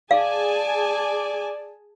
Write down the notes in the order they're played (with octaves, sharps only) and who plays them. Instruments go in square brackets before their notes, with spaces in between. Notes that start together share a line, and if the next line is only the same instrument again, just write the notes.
[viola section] G#4 G#5 A5 [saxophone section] D5 [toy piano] F5